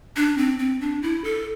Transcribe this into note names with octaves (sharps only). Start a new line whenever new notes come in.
D4
C4
C4
D4
E4
A4